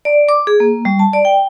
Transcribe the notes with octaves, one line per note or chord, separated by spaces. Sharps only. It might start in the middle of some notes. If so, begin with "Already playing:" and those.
D5
D6
G#4
A#3
G3
A5
D5
G5